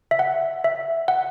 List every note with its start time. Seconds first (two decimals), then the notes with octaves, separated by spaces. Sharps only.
0.11 E5
0.19 F#5
0.64 E5
1.08 F#5